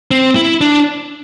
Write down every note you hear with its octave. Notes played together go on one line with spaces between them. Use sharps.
C4
E4
D4